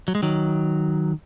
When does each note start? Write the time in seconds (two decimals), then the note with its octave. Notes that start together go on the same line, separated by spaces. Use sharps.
0.08 F#3
0.15 G#3
0.22 D#3 F#3